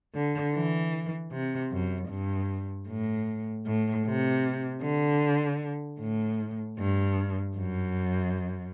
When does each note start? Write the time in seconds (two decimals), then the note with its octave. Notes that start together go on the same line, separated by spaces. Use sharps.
0.15 D3
0.54 E3
1.32 C3
1.71 F#2
2.09 G2
2.88 A2
3.66 A2
4.05 C3
4.82 D3
6.00 A2
6.78 G2
7.56 F#2